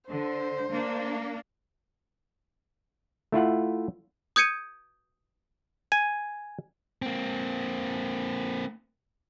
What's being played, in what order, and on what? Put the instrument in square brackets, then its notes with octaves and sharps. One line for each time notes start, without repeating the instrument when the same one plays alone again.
[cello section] D3 [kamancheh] C5
[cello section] A#3 D4
[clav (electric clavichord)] A3 E4 F4 F#5
[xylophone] D#6 G6 G#6 C#7 D#7
[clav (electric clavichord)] G#5
[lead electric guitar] A#3 C4